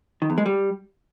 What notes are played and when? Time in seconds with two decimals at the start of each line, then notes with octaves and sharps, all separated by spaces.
0.22 D#3
0.30 E2
0.38 G#3
0.46 G3